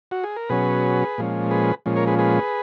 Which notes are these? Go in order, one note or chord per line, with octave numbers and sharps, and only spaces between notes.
F#4
G#4
A#4
B2 F#3 C#4 G#4 B4
A#2 F3 G#3 C#4
G#4 B4
A#2 F3 G#3 C#4
A#4 C#5
G#4 B4
G#4 B4